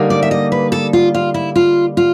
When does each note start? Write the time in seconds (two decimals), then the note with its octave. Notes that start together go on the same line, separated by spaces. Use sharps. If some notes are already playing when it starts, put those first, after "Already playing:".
Already playing: D3 G3 A#3 D#4
0.10 D5
0.22 E5
0.31 D#5
0.52 B4
0.72 A4
0.93 F4
1.14 F4
1.34 E4
1.56 F4
1.97 F4